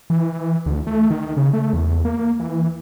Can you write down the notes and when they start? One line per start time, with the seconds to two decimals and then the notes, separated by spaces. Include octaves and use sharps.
0.10 E3
0.66 D2
0.87 A3
1.11 D#3
1.37 C#3
1.53 A3
1.73 E2
2.05 A#3
2.40 E3